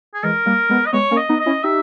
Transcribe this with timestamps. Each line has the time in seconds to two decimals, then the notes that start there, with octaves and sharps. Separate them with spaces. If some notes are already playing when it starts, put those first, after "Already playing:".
0.15 G#4
0.23 E3 G#3 A#4
0.46 G3 A#3
0.69 G#3 B3
0.86 D#5
0.93 G#3 B3 C#5
1.11 A#3 C#4
1.17 D#5
1.29 B3 D#4
1.40 D#5
1.46 C#4 E4
1.63 D#4 G4 E5